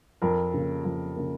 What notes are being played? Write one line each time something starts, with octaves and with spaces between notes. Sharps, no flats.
F2 A#4
C#3 A#3
F2
C#3 A#3